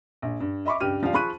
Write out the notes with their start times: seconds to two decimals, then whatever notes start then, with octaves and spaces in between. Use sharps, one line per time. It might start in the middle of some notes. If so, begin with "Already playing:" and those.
0.22 A#1
0.40 G2
0.66 D#5 E5 B5 C#6 D6
0.80 C#2 G2 G4 F6 D#7
1.03 F3 G3 D4 F5
1.14 F3 G#4 B5 C#6 F#6 D#7